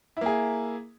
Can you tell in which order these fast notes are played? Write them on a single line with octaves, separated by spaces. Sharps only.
E4 A#3 G#4